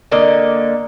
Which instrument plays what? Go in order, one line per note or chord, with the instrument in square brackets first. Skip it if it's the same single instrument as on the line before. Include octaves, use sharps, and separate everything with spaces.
[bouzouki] D3 A#3 D#5